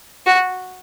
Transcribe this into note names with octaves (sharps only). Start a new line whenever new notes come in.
F#4